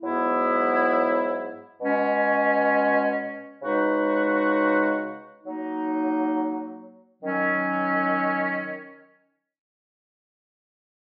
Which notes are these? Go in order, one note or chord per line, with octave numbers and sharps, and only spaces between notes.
G#2 F#3 B3 E4
B2 G#3 C#4
C#3 G#3 D#4 F#4 B4
F#3 A#3 D#4
D#3 F#3 C#4